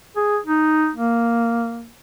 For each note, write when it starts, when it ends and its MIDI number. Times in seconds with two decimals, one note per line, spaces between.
0.16 0.38 68
0.45 0.90 63
0.96 1.89 58